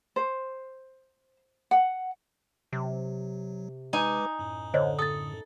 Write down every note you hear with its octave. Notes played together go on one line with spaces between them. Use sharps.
C5
F#5
C3 F#3
G#3 D#4 B4 G#5 D6
F#2 A2
D3 C5 C#5 D#5
A4 D#6 A6